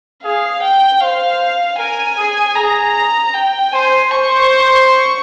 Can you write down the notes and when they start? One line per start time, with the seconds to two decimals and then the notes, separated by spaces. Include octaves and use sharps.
0.23 G#4 F5
0.63 G5
1.01 C5 F5
1.78 A#4 G#5
2.17 G#4
2.56 G#4 A#5
3.34 G5
3.72 C5 G#5
4.11 C5 C#6
4.89 C#6